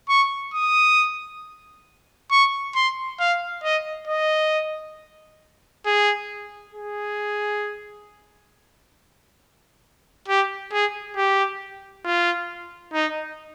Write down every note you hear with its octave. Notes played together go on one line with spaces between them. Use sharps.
C#6
D#6
C#6
C6
F5
D#5
D#5
G#4
G#4
G4
G#4
G4
F4
D#4